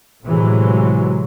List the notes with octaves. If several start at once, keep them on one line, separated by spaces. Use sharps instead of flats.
A2 C3 E3 F#3 G#3